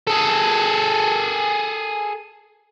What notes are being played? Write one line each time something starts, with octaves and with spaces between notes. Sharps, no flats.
G#4 A4